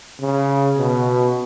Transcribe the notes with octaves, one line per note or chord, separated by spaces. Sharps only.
C#3
B2